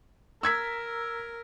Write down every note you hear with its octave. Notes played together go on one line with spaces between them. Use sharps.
A#4 E6 G#6 B6